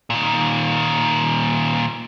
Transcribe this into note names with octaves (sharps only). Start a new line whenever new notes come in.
A#2 D#3